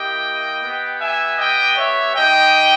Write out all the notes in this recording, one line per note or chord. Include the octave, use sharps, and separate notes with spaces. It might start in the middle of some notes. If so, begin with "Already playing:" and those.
Already playing: A#3 E4 G4 D#5 G5
B3 G4
E5 G#5
D#5 G5
C#5 E5
G#3 D#4 G4 D#5 G5